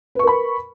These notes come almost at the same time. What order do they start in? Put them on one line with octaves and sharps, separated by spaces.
B4 C#6 A#4 B5